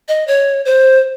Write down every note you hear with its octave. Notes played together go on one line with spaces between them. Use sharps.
D#5
C#5
C5